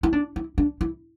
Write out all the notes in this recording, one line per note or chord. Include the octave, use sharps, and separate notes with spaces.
E4
D4
E4
D4
E4